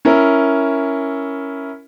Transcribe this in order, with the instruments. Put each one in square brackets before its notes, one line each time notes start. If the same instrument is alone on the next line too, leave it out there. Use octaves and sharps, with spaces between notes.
[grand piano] C#4 E4 A#4